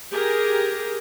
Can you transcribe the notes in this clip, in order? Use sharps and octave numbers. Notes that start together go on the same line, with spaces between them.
G4 G#4 A#4